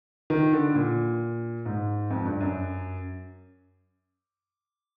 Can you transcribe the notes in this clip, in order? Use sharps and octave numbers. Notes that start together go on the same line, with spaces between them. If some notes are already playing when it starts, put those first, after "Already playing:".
D#3
D3
A#2
G#2
F2
G2
F#2